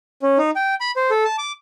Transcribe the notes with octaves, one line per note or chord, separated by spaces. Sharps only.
C#4
D#4
G5
B5
C5
A4
A5
D6